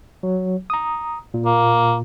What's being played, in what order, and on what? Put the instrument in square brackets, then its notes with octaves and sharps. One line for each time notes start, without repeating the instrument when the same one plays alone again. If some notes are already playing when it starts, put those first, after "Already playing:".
[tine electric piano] F#3
A#5 D#6
A#2
[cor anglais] A#3